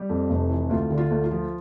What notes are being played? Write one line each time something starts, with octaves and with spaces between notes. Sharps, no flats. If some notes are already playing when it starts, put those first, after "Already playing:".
Already playing: G3 G4
F2
F1
E3
D2 F4
D3
F4
D2
F4
F3